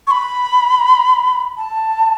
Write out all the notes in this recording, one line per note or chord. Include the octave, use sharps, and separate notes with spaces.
C#6
B5
A5